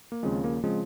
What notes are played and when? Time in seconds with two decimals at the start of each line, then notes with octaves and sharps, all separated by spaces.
0.12 A#3
0.23 D#2 C#3 F3 G#3 C4
0.44 A#3
0.63 C#3 F3 G#3 C4